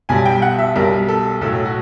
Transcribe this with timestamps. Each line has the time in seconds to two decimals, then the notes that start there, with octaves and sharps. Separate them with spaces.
0.09 B1 B2 G3 G#5
0.25 G5
0.42 F#5
0.59 E5
0.75 B1 B2 G3 A#4
1.09 A4
1.41 B1 A2 F#3 A4
1.65 F#4